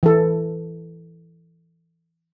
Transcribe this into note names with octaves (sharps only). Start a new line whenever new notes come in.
E3 A4